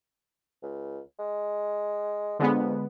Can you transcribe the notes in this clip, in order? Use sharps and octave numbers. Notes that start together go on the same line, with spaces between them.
C#2
G#3
F2 D3 G#3 B3